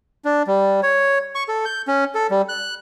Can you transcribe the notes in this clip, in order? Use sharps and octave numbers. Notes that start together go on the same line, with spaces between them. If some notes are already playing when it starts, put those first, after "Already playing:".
D4
G3
C#5
C#6
A4
G6
C#4
A4
G3
F#6